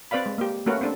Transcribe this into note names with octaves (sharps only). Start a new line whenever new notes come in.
C4 B4 D5 F5 B5
G#3
A#3 G4
A3 A#3 C#4 F#4 A#4 B4
C4 D4 A4